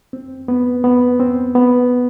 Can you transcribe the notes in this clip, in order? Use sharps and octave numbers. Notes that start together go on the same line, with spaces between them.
C4
B3
B3
C4
B3